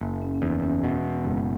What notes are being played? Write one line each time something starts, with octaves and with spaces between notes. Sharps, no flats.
F#1 A#3
C#4
C#4
E2 D#4
C#4
B2 B3
F#1 G#3